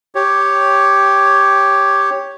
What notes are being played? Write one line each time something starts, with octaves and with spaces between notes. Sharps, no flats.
G4 C#5